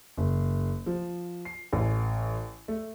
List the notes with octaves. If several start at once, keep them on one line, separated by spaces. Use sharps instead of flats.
F#1
F3
C7
A1
A3